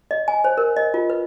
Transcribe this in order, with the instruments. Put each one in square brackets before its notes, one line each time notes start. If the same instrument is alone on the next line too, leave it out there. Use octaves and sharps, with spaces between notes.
[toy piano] D#5
G#5
C5
A#4
D#5
F4
B4